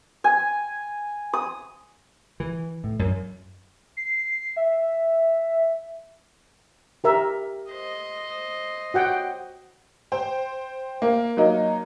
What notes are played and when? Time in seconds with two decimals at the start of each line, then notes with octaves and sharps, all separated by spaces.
0.24 G#5
1.33 D#6
2.40 E3
2.84 A2
2.99 F#2
3.97 C7
4.57 E5
7.04 G4 A#4 E5
7.71 C5 D#5
8.94 F#4 F#5 G5
10.12 C5 G5
11.02 A#3
11.37 F#3 A#3 D#4